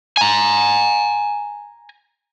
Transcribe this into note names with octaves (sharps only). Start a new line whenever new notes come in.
G#5 A#5